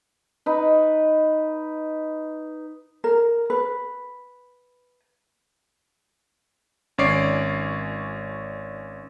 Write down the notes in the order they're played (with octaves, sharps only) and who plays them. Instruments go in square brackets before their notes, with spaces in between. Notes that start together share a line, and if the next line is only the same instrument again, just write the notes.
[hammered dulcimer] D#4 B4
[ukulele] A#4
B4
[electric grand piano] G#1 C#4 C#5 D5 C7 D7